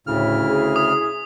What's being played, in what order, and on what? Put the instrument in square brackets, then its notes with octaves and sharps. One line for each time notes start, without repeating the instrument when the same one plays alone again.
[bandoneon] D2 C#3 F6 [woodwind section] A2 [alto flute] E4
[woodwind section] G#4
[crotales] D#6